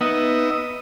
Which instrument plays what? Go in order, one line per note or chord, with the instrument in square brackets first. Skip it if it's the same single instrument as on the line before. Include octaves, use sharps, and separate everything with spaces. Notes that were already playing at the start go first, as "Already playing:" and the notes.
[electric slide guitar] B3 [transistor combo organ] D#4 D#5 E5